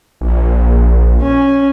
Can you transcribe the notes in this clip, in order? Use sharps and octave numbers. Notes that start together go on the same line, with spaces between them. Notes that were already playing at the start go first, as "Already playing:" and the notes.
A#1
C#4